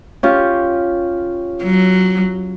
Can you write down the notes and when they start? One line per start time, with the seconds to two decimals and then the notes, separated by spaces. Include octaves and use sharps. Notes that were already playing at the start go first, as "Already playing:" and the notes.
0.23 C#4 F4 G4
1.62 F#3